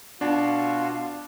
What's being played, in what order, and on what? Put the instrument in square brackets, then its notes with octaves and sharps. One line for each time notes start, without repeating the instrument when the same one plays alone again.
[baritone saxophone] B2 [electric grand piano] D4 [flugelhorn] F4